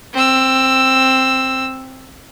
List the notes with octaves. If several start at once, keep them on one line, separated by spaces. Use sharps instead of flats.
C4 E6